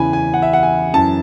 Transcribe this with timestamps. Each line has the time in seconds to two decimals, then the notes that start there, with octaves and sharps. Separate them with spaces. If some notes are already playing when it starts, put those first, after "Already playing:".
Already playing: E2 C#3 E3 G#5 B5
0.13 G#5
0.34 F#5
0.42 E5
0.53 F#5
0.63 G#5
0.93 F#2 E3 A5